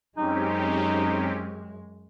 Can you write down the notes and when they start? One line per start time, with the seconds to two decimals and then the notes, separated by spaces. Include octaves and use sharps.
0.17 F#2 G#3 C4 C#4 D#4 G4